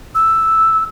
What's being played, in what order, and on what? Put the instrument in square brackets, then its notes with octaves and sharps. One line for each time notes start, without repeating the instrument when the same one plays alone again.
[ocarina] E6